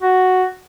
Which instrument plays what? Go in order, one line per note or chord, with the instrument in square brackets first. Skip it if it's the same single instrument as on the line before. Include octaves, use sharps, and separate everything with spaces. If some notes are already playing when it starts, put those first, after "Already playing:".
[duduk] F#4